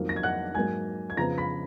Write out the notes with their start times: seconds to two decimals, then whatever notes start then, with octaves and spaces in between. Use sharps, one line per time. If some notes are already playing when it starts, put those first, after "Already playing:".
Already playing: F2 D#3 F#3 A#3
0.09 A#6
0.16 G#6
0.23 F#5 F#6
0.54 G#2 F#3 A#3 G#5 G#6
1.10 G#6
1.17 F2 C#3 F3 B3 A#5 A#6
1.38 B5 B6